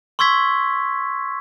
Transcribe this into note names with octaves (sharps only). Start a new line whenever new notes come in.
C6 C#6 E6 G#6 B6